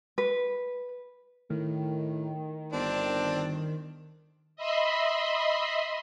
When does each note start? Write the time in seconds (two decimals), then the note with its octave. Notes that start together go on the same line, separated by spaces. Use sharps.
0.18 B4
1.50 A2 D#3
2.73 G1 C4 D4
4.56 D#5 E5 B5 C6